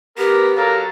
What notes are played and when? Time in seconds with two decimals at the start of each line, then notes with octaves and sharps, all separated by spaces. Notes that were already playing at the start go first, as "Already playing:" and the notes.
0.18 B3 G4 A#4 B4
0.56 F#3 A4 A#4 F5